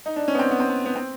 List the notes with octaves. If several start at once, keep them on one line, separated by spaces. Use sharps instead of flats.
D#4
D4
C#4
B3
C4
B3
C4
B3
B3
C4